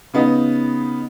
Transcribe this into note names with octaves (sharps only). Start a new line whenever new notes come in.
C#3 B3 D#4